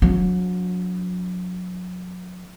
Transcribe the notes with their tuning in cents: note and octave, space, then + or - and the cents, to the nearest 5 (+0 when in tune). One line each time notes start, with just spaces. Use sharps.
F#3 -35 D4 -30